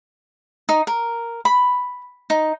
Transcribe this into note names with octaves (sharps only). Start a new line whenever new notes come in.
D#4
A#4
B5
D#4